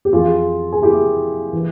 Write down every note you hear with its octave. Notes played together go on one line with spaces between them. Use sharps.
G4
F2 E3 F4 G#4
G#4
E4 G4
E3